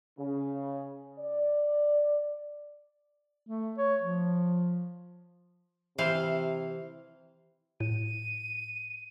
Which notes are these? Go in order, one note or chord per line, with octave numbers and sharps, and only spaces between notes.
C#3
D5
A3
C#5
F3
C3 E3 C5 F5
A2 D#7